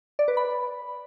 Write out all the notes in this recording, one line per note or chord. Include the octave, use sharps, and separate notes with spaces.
D5
B4
B5